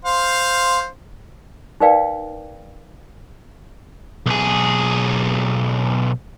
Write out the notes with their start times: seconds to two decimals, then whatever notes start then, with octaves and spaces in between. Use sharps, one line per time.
0.05 C5 F5
1.80 D#4 A#4 B4 D5 F5 G5
4.26 B1 G#4